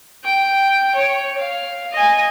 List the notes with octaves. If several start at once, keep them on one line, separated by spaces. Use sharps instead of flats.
G5
C#5
F5
D#5 G#5